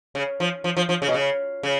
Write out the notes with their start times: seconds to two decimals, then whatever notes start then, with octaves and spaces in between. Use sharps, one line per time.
0.15 C#3
0.40 F3
0.64 F3
0.77 F3
0.89 F3
1.02 C#3
1.09 B2
1.14 C#3
1.63 C#3